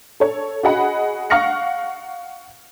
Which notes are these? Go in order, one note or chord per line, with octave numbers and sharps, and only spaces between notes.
A4 C#5
F#4 G#4 D#5 F#5 B5
F5 F#5 C#6 F6 A#6 C#7